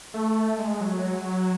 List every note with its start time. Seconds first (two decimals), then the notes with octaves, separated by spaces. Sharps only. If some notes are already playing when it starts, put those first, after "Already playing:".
0.14 A3
0.59 G#3
0.81 F#3